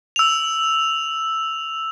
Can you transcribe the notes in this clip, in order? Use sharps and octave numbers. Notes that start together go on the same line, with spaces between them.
E6 F7